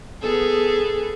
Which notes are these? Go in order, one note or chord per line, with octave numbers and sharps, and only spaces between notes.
B3 G#4 A4